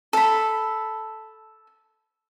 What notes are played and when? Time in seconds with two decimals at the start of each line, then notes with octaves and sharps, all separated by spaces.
0.13 A4 B5